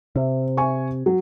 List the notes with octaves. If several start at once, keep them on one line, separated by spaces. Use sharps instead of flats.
C3 E5
E5 G#5 C#6
F#3